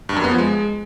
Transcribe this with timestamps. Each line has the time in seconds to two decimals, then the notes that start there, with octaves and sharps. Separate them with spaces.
0.09 G2
0.16 F#2
0.24 B3
0.31 F3
0.39 G#3